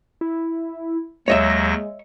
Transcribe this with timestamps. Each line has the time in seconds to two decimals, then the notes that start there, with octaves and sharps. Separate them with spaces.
0.21 E4
1.28 D#2 F#3 G#3 C#5 D#5 E5 A#6